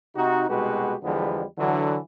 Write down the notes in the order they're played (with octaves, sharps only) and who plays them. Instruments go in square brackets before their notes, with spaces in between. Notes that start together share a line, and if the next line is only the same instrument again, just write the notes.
[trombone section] C3 D#4 F#4
C2 B2 G#3 F#4 G4 B4
E2 D3 F3 G3 G#3 B3
D3 E3 F#3